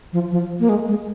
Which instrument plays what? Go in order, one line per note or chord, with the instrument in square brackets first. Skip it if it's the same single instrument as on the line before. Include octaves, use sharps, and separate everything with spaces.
[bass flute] F3
F3
A#3
G#3
G#3